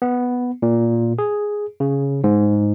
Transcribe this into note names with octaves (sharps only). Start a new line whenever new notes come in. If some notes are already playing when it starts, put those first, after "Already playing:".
B3
A#2
G#4
C#3
G#2